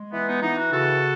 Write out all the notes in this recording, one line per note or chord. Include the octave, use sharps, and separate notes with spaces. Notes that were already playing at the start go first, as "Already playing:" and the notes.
Already playing: G#3
E3 B3
B3 D#4
E3 B3 D#4
D#4 F#4
C#3 F#4 A4